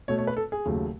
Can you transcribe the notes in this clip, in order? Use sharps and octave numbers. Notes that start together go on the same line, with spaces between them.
B2 A3 C#5
C#5
B4
A4
G#4
D#2 C#3 F#3 A3